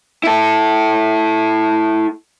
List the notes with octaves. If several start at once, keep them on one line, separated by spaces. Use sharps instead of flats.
E4 A4